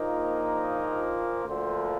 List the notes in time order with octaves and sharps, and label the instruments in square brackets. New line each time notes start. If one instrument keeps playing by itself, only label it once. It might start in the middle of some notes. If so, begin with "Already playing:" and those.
Already playing: [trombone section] A#1 A#2 F3 A#3 D#4
D2 D3 F3 A#3 C5